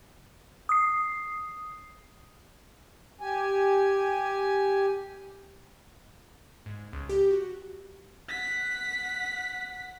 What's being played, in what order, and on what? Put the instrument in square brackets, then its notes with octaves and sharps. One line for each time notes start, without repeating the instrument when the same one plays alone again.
[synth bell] D#6 C7
[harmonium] G4 G#5
[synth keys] G#2
C#2
G4
F#4
[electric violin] F#5 B6